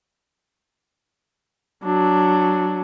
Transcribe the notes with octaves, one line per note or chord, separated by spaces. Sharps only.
F#3 D4